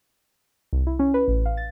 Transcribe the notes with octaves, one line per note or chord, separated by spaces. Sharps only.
C2
E4
C#4
B4
A1
F5
A6